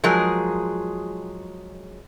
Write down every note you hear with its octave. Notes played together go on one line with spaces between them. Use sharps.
F3 F#3 G#3 G#4 A#4